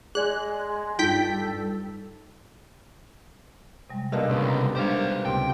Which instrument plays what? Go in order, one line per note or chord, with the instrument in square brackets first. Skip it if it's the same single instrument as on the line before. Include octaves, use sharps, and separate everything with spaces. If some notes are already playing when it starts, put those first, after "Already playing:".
[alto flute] G#3 [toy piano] G#4 D5 [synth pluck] F#6
[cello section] G2 [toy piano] D#4 F4 [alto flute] A4 [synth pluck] G5 G6 B6
[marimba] C3 G3 G#3
[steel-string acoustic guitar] D#2 B2 D3 [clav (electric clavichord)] A#3 [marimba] B4 F5 A5
[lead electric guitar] C2 [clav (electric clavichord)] C#3
[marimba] G3 G#3 D4 [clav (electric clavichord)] G4 A#4 F5 [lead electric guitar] C5 D5
[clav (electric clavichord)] C#2 C3 [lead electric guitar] G5